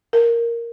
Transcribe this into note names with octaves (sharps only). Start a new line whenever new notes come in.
A#4